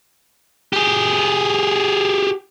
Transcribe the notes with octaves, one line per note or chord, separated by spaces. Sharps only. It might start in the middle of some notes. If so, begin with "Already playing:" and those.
G4 G#4